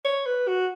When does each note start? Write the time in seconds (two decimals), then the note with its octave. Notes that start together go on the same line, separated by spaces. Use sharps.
0.05 C#5
0.26 B4
0.48 F#4